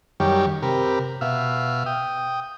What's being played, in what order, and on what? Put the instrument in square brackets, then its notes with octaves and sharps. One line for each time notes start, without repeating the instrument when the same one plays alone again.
[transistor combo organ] F#2 D#3 G3 G4 C#5
C3 G4 A#4 B5
B2 E5 F5
G5 D#6